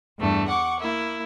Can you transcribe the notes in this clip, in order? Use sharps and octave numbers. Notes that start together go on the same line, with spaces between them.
E2 G2 E3 A3
F#5 C#6 D6
A#3 E4